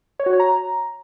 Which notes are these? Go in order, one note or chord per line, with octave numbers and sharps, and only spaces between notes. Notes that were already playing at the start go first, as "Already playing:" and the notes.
C#5
F#4
C#5
A#5